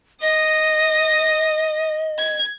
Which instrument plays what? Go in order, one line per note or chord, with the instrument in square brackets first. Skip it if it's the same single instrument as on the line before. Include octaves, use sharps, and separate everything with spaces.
[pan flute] D#5 [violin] D#6 A#6
[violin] G#6